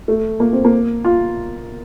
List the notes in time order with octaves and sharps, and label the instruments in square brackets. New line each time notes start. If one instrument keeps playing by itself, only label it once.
[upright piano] A3
A#3
C4
A#3
F4